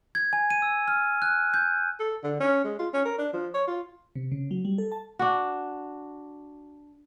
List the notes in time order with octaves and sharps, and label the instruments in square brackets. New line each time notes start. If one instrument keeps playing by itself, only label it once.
[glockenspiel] G#6
G#5
D#7
E6
F6
F#6
G6
[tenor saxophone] A4
D3
C#4
G#3
F4
C#4
A#4
D4
F3
C#5
F4
[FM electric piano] C3
C#3
F#3
G3
A4
A5
[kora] D4 F#4